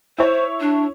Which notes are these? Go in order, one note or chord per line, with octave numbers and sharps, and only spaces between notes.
E4 C5 C#5
D4